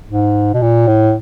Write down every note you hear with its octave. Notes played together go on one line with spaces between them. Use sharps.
G#2
B2
A#2
A2